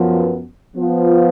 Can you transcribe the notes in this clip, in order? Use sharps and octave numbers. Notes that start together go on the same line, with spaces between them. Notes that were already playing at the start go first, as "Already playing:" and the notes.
Already playing: F#2 F3 B3
F3 B3 F4